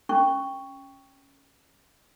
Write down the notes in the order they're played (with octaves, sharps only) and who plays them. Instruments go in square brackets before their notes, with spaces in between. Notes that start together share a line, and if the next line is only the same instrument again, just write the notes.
[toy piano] C#4 C#6